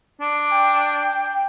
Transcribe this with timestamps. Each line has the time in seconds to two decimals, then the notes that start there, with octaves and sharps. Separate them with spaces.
0.21 D4
0.52 G5